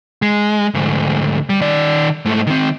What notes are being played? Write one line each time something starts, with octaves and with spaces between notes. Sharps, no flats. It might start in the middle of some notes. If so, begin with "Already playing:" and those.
G#3
D2 G#2
G3
D#3 D5
G#2 A3
D#3 C4